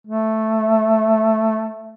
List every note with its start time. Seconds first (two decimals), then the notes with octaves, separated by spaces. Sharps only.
0.07 A3